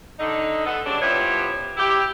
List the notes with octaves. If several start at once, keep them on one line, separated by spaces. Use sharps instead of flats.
D3 D#4
B3 A4
G2 C#3 F#3 D4
F3 G3 B3 E4 G4 C#5
E4 G4